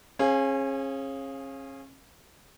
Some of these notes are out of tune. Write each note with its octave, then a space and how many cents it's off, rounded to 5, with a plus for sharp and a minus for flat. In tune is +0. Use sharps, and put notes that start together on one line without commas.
C#4 -35 G#4 +0 F5 +0